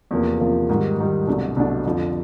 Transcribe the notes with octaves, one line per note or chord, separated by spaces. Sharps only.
E2 C3 F3 A#3
E2 C3 F3 A#3
G#2 D#3 G3
G#2 D#3 G3
C2 B2 F#3 A3 D4
C2 B2 F#3 A3 D4
F2 D3 F3